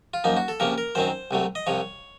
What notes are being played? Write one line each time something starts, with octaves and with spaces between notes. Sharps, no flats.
F4
F#2 F3 A#3 D#4
F#4
A4
C#2 C3 F3 A#3 C#4 A#4
A#4
F#2 D#3 F#3 C4 C5
C2 C3 F#3 A3
D#5
C2 C3 F3 C#5